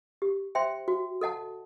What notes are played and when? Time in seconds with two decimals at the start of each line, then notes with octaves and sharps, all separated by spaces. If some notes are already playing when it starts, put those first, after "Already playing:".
0.22 G4
0.55 C5 E5 G5 C6
0.88 F#4
1.21 A4 D#5 F#5 A5